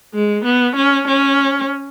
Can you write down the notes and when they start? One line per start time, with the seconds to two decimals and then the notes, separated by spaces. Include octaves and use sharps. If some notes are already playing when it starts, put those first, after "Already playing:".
0.14 G#3
0.45 B3
0.76 C#4
1.08 C#4